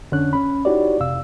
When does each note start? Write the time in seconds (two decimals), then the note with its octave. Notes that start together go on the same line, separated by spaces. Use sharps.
0.12 F2 D3 C#4 D4 C#5 F#6
0.33 C#4 B5
0.65 D#4 E4 F#4 G4 C#5 D5
1.00 F2 C3 F5 E6